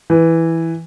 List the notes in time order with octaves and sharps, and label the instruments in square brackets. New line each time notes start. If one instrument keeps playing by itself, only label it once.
[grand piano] E3